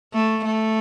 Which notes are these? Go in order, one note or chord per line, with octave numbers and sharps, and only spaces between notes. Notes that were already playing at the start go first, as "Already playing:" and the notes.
A3
A3